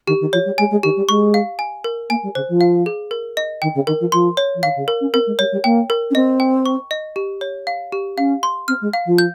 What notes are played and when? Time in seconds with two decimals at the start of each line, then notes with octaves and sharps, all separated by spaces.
0.07 D#3 G4
0.20 D#3
0.33 F3 C#5
0.45 G3
0.58 G#3 G#5
0.71 G#3
0.83 D#3 G4
0.96 G3
1.08 G#3 C#6
1.34 F5
1.59 G#5
1.84 A#4
2.09 A#3 G#5
2.23 G3
2.35 C#3 C5
2.48 F3
2.61 F5
2.86 G#4
3.11 A#4
3.37 D#5
3.62 D#3 G5
3.75 C#3
3.87 D#3 A#4
4.00 F3
4.12 F3 C6
4.37 C#5
4.55 F3
4.63 D#3 F5
4.76 C#3
4.88 A#4
5.01 C#4
5.13 C4 A#4
5.26 G#3
5.38 G3 C#5
5.52 G3
5.64 A#3 G5
5.90 A#4
6.11 C#4
6.15 C4 D#5
6.40 G5
6.66 C#6
6.91 D#5
7.16 G4
7.41 C#5
7.67 F5
7.92 G4
8.17 C#4 F5
8.43 C6
8.68 C4 F6
8.81 G#3
8.93 F5
9.05 F3
9.18 G6